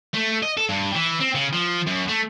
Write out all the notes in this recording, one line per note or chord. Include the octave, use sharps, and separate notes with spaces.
A3
D#5
A4
G2
E3
C4
C#3
F3
F#2
A3